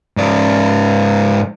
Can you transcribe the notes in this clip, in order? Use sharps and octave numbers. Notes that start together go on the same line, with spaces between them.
G#2 D5